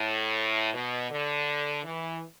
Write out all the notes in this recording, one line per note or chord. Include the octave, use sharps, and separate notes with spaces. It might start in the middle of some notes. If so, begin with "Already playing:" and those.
Already playing: A2
B2
D3
E3